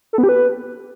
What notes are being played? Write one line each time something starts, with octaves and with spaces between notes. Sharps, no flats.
A4
B3
G4
B4